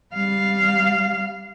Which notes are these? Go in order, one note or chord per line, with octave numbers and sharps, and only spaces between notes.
G3 F5